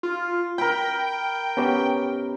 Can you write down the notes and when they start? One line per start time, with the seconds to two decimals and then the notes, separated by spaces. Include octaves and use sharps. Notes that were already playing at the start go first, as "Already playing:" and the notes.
0.03 F4
0.58 A#4 G5 B5
1.57 B3 C#4 G4